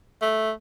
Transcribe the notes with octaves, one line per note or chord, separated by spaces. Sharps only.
A3